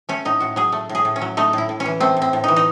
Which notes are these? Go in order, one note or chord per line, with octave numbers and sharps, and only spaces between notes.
A3 C#4
A2 D#4
A2 F#4
F#3 G#4
A3
A2
G#4
A2
C#4
F#3
A3 D#4
A2 E4
A2
C#4
E3
A3 C4
A2
C4
A2
E3 D#4
D#4